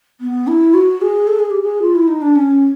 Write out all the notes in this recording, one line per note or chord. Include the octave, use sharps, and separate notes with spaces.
B3
E4
F#4
G#4
A4
G#4
G4
G#4
F4
E4
D#4
D4
C#4